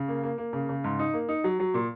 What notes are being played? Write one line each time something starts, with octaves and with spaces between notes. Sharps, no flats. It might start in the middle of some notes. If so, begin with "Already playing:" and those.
Already playing: C#3
A#3
A#3
A#3
C#3
C#3
G#2
D#4
A#3
D#4
F#3
F#3
A#2